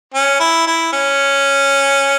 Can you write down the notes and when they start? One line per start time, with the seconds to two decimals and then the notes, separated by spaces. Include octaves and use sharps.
0.14 C#4
0.40 E4
0.67 E4
0.93 C#4